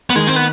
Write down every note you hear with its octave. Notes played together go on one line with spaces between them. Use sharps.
B3
D#3 G#3
C4
B3